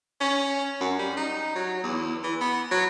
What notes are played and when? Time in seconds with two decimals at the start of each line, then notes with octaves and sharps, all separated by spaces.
0.21 C#4
0.80 F#2
0.99 G3
1.17 D#4
1.55 F#3
1.83 E2
2.23 E3
2.41 B3
2.71 F#3